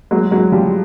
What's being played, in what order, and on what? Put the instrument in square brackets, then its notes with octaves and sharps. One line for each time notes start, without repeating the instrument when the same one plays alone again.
[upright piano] F#3 G#3
F#3 G#3
F3 G3